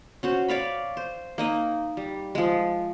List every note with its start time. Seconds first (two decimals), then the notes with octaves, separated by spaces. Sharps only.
0.23 C#4 F#4 C5
0.49 C#5 D5 F5 B5
0.97 C5
1.38 A#3 D#4 D#5
1.97 G3
2.35 F3 G#3